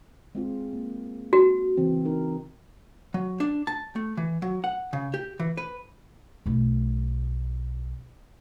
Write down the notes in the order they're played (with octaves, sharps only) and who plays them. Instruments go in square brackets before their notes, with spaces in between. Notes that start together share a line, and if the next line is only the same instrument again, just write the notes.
[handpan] G#3 C4 F4
A#3
[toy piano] F#4
[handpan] C#3 E3 C4
D#4 A#4
[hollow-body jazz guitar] F#3
D4
A5
A3
E3
F#3
F#5
C#3
G4
E3
B4
[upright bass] B1 A3